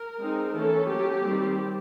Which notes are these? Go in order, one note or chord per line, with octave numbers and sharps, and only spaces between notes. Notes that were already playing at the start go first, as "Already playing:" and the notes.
Already playing: A#4
G#3 C4 D#4
E3 A3 C#4 A4
F#3 A#3 C#4 G4
D#3 G3 C4